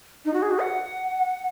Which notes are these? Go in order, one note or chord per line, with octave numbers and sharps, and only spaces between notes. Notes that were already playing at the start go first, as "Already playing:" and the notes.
D#4
F#4
G#4
F#4
F#5